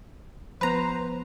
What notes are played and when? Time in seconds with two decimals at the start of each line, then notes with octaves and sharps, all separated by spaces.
0.61 F3 B3 B4 C5 A#5